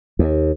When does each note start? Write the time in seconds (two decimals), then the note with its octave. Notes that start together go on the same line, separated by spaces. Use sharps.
0.19 D#2